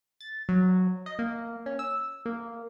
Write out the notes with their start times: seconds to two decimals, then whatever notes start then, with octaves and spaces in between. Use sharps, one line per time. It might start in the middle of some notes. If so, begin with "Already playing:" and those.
0.20 A6
0.49 F#3
1.06 D#5
1.19 A#3
1.66 C#4
1.79 E6
2.26 A#3